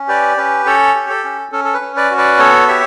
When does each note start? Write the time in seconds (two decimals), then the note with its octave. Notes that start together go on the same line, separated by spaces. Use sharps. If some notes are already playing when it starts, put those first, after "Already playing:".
Already playing: C#4
0.08 G4 B4 D5
0.37 C#4 B4
0.66 C#4 A4 C#5
0.95 G4
1.10 A4
1.24 C#4
1.52 C#4 A4
1.65 A4
1.74 B4
1.81 C#4
1.96 B4 D5
2.11 F#4
2.18 B4 D5
2.39 B3 A4 C#5
2.68 G4 C#5 E5